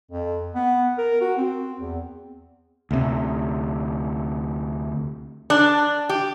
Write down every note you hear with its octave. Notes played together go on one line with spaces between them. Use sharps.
F2
B3
A#4
F#4
C4
E2
D2 C3
D4
G4